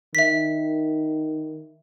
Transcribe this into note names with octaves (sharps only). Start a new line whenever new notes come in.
D#3 E5 B6